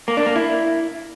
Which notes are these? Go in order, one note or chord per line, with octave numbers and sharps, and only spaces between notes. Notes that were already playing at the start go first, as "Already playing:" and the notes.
A#3
D4
A#3
E4